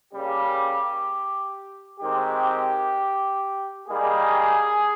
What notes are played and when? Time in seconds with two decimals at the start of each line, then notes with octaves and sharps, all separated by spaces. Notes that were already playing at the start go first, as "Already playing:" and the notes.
0.13 C#3 G3 A#3 G4
2.00 D#3 G#3 C4 G4
3.87 D#3 G3 A#3 G#4